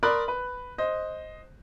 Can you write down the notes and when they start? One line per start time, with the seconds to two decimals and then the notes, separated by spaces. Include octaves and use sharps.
0.03 A#4 D5 B5 C6 D#6 F#6
0.28 B4
0.78 C5 D#5